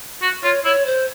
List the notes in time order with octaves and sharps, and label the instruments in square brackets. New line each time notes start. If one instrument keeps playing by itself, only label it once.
[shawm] F#4
[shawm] F4 [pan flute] C#5
[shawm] E4 [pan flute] C#5
[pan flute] C5